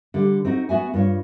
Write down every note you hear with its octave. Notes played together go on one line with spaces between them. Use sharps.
D3 G3
C4 D#4 F#4
B3 F#4 E5 G#5
G2 F4 C#5